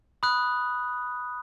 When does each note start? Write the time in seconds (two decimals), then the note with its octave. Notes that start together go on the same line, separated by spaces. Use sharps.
0.23 B5 D#6 F#6